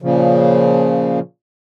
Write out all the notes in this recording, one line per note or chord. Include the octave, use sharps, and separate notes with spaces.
A#2 C#3 F3